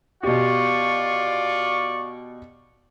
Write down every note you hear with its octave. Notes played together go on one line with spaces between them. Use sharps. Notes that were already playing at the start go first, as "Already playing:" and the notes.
B2 F4 G4 D5 C#6